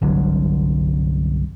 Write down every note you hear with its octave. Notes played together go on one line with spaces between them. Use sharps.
G1 C2 D3 F#3